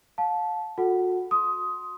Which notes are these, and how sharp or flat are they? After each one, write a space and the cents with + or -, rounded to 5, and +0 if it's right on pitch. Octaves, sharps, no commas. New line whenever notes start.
F5 +35 A5 -15
F#4 -35 A4 +0 F#5 +20
C6 +0 D#6 +15